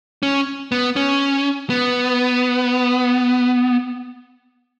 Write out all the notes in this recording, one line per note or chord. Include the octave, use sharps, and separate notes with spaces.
C#4
B3
C#4
B3